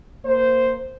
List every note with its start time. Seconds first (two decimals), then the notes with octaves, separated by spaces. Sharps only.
0.25 A#3 C5